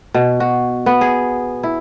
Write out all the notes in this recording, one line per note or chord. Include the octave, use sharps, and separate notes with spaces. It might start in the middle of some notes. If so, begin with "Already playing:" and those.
B2
F#4
B3
G#4
E4